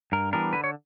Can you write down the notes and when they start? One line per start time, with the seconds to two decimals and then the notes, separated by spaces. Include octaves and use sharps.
0.12 G2 A#4
0.33 E3 G3 B3 D4 A#4
0.53 D3 B4
0.64 C#5